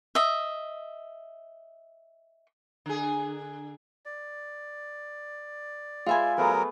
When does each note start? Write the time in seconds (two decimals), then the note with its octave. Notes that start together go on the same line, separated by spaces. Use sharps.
0.15 D#5 E5
2.86 D3 G#4
4.06 D5
6.06 G#3 F4 B4 E5 G#5
6.38 F#3 A3 B3 G#4 A#4